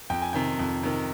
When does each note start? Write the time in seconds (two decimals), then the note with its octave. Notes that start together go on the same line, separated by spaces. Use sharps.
0.10 F2 G5
0.22 G#5
0.33 C3 D#3 G5
0.59 F2
0.83 C3 D#3